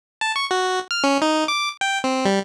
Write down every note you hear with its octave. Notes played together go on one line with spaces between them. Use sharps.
A5
C#6
F#4
F6
C#4
D#4
D6
G5
C4
G3